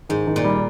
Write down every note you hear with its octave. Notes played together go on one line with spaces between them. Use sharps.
G#2 D#3
D#3
A#2
G3